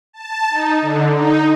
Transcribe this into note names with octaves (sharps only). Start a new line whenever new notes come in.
A5
D#4
D3
D#4